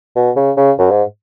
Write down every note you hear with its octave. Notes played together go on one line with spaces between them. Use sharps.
B2
C#3
C#3
F#2
G#2